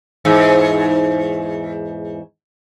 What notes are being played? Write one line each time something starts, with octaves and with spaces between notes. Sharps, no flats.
E2 G#2